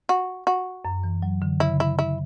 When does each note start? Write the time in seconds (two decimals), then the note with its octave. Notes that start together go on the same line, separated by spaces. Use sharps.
0.09 F#4
0.47 F#4
0.85 F#2
1.04 E3
1.22 F#3
1.42 D3
1.60 C#3 E4
1.80 E4
1.99 E4